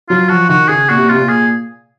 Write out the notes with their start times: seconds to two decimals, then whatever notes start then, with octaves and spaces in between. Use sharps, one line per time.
0.10 F#3 F4
0.29 F3 F#4
0.49 D#3 F#4
0.69 C#3 G#4
0.89 A#2 F#4
0.96 C3
1.03 A#2
1.09 C3 F4
1.18 A#2
1.29 G#4